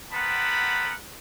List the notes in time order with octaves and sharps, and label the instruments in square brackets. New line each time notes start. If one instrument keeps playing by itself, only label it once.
[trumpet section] B3 C4 A#4 F#5 A5 B5